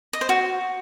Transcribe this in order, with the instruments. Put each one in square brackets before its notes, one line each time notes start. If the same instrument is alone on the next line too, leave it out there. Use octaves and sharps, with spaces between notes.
[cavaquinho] D#5
C5
F#4